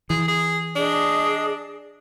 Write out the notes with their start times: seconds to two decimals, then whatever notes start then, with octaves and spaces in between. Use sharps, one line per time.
0.10 E3 G#4
0.28 G#4
0.76 D4 G#4 D#5